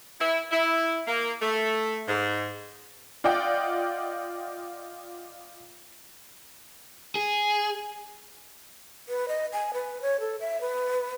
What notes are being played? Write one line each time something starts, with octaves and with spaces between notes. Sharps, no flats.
E4
E4
A#3
A3
G#2
F4 D5 D#5 F#5 G5
G#4
B4
D#5
G#5
B4
C#5
A4
E5
B4